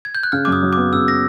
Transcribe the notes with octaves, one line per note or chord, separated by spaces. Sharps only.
G#6
G6
F#6
C#3 F6
F#2 D6
D#6
F#3
B3 D6
C#3 E6
A#6